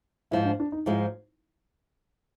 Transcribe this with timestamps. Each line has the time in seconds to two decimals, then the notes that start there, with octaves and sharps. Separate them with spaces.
0.31 G#2 F3 G#3 E4
0.45 D4
0.60 D4
0.72 D#4
0.86 G#2 F3 G#3 E4